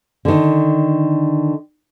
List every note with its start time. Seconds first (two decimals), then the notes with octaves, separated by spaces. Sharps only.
0.25 D3 D#3